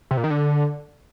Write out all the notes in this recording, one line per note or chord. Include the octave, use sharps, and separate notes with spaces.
C3
A#2
D#3
D3